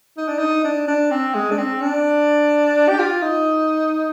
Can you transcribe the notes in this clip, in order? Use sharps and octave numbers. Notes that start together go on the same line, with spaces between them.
D#4
D4
D#4
D4
D4
C4
G#3
D4
C4
D4
G4
F4
D#4